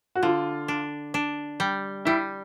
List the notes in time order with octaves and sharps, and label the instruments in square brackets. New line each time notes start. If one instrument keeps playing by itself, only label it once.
[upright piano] F#4
[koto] D3 [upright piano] F4
[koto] D4
D4
G3
[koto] G3 [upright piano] E4